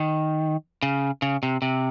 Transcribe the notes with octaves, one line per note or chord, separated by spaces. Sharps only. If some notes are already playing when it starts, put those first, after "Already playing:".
Already playing: D#3
C#3
C#3
C3
C3